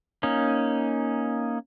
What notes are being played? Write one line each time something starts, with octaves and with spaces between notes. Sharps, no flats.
A#3 C#4 D#4